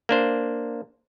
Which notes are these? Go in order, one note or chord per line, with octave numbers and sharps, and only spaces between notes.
A#3 D4 C5